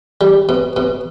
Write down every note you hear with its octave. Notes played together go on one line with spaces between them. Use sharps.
G3
B2
B2